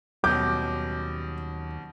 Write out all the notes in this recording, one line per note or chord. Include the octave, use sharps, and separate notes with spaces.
D#2 B2 F#3 G3 C#4 D6 G6